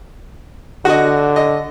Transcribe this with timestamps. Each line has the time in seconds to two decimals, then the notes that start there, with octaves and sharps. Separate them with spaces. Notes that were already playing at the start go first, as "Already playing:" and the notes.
0.85 D3 F#4 D#5
1.36 D#5